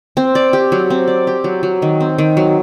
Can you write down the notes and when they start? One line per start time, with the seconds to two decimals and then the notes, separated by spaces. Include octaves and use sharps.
0.17 C4
0.35 D5
0.53 G4
0.72 F#3
0.90 C4
1.08 D5
1.27 G4
1.44 F#3
1.63 F#3
1.82 D#3
2.00 C4
2.18 D#3
2.37 F#3